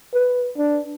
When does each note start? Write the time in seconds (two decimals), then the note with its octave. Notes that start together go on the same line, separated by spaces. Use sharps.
0.14 B4
0.58 D4